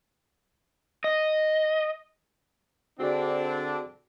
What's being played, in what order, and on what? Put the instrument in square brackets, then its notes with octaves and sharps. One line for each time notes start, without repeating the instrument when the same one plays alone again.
[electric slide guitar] D#5
[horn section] D3 C4 D4 [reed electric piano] F#4 G#4 D5